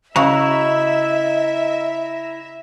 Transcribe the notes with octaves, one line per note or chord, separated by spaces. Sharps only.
C#3 E4 F#4 D#5 E5 A#5